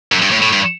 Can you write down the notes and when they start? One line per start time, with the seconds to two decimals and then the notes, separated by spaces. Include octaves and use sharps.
0.12 F#2
0.22 G2
0.32 A2
0.42 A2
0.53 G2